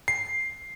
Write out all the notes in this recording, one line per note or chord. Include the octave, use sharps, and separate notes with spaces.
C7